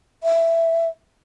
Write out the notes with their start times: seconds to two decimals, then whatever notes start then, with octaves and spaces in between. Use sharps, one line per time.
0.23 E5